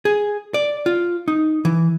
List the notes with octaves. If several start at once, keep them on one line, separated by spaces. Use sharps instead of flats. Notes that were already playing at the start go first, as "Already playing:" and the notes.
G#4
D5
F4
D#4
E3